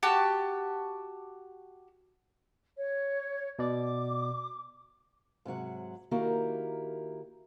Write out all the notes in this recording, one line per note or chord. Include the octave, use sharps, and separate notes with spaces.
F#4 G4 A5
C#5
B2 D5 D6
G#2 C3 F#3 F#5
D#3 A#3 E4 F#4 G4 A#4